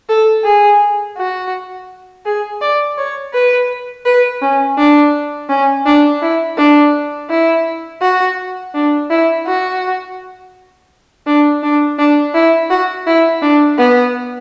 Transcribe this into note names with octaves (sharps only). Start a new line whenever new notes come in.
A4
G#4
F#4
G#4
D5
C#5
B4
B4
C#4
D4
C#4
D4
E4
D4
E4
F#4
D4
E4
F#4
D4
D4
D4
E4
F#4
E4
D4
B3